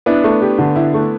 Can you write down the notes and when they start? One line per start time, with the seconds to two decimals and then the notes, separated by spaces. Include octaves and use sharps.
0.06 B3 D4 E4
0.24 A3
0.42 G4
0.59 D3
0.76 E4
0.94 A3